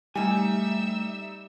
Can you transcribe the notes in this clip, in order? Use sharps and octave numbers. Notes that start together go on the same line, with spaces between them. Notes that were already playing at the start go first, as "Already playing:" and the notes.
G3 A3 D#4 E5 G#5 E6